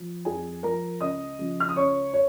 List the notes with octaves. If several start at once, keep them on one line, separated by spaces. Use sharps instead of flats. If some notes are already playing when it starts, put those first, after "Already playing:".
Already playing: F3
F2 G#4 G#5
F3 A#4 A#5
C#2 D#5 D#6
C#3 F3
F6
D#6
C#2 C#5 C#6
C#5